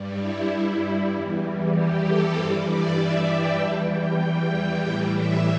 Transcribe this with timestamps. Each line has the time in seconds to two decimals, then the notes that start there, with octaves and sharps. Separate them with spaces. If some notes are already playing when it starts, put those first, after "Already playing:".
Already playing: G2 G3
0.21 E4
1.13 E2 E3 G3
1.75 G4
2.06 A4
2.36 G2 E3 G3 C5
2.67 D5
2.98 E5
3.29 G5
3.60 E2 E3 G3 A5
3.91 G5
4.83 A2 E3 G3 G5
5.14 E5